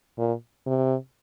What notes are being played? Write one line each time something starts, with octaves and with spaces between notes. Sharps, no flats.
A#2
C3